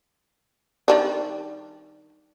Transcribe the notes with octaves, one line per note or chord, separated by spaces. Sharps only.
D#3 G3 D4